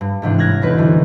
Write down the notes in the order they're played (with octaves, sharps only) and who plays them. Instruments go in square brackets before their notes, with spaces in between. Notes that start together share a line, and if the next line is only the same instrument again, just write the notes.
[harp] G2
G#2 C3 E3 D4
A1 F6 F#6 G#6 A#6
B1 E2 B4
F#2 D3 E3 F#3